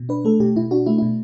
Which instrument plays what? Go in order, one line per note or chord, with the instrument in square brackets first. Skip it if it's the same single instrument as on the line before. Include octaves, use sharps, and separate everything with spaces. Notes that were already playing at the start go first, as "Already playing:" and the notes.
Already playing: [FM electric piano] B2
D4 B4
A3 A4
B2 G4
B2 E4
D4 F#4
A3 E4
B2 E4